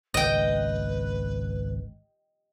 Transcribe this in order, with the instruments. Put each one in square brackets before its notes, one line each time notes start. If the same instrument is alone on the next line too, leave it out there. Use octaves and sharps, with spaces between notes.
[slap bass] G#1 C#2 [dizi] B4 [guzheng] D#5 G5